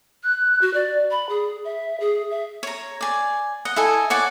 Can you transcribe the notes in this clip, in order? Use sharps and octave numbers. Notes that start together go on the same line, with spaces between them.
F#6
F#4
D5
B5
G#4
E5
G#4
E5
C#5 A#5
D5 G#5
D#5 F#5
E4 A4 D#5 G#5
C#5 D5 F#5 G#5